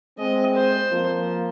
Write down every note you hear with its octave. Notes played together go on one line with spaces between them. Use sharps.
G#3 C4 D#5
C5
F3 A#3